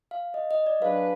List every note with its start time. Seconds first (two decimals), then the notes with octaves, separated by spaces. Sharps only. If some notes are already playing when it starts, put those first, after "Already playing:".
0.11 F5
0.34 D#5
0.51 D#5
0.66 D5
0.81 F#3 D4 G#4 B4 F5